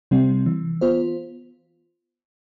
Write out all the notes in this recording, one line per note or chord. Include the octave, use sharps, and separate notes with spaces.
C3 G3 C4
E3
B3 F4 C5